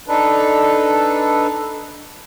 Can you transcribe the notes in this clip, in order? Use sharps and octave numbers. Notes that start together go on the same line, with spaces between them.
D4 D#4 A4 B4